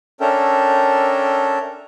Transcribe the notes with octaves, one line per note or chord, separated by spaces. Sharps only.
C#4 D4 A4 A#4 E5 G5